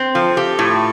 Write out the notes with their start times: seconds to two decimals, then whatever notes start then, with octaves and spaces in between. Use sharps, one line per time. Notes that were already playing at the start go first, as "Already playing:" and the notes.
Already playing: C4
0.14 F3 A4 C5
0.36 F4 G4 A4
0.59 A2